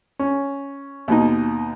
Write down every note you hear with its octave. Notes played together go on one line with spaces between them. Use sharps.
C#4
D#2 B2 D#4